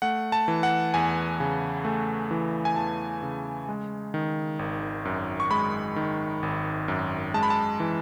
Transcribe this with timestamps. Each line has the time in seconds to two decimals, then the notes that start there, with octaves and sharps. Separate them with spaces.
0.02 A3 F#5
0.32 A5
0.48 E3
0.63 F#5
0.94 E2 G#5
1.40 C#3
1.85 A3
2.31 E3
2.65 G#5
2.76 E2 A5
3.23 C#3
3.69 G#3
4.14 D#3
4.59 G#1
5.05 F#2
5.40 C#6
5.51 G#3 B5
5.96 D#3
6.43 G#1
6.88 F#2
7.34 G#3 A5
7.43 B5
7.50 A5
7.80 E3